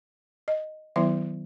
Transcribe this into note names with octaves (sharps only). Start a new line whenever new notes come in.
D#5
D#3 F#3 B3 E4 E5